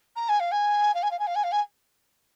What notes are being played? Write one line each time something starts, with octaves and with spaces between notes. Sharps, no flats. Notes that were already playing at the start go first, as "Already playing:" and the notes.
A#5
G#5
F5
G#5
F5
G#5
F5
G#5
F5
G#5
F5
G#5